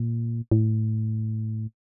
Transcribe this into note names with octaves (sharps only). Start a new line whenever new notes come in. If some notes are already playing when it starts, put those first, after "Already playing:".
Already playing: A#2
A2